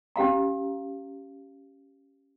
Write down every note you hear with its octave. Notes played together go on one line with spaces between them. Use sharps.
C#4 G4 F5 A#5